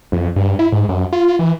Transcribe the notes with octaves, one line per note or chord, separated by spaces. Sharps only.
F2
G2
E4
G#2
F#2
F4
E3